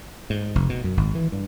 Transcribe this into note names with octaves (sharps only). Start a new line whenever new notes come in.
G#2
F1
B2
F#2
G#1
E3
G2